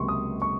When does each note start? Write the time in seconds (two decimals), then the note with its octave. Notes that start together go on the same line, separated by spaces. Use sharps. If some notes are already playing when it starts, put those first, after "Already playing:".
Already playing: C#2 C3 F#3 A#3 C6 C#6
0.08 D#6
0.42 C#6